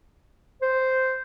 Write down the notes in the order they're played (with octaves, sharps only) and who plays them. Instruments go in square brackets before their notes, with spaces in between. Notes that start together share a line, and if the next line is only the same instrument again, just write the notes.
[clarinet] C5